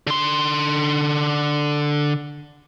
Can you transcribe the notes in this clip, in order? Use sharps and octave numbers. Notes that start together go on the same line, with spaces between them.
D3 C6